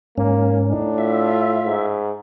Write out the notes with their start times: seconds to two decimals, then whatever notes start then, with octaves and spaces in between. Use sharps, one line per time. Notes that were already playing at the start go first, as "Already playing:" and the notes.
0.18 G#2 A#3 C#4
0.69 A2 D4 D#4
0.98 F4 E5
1.65 G#2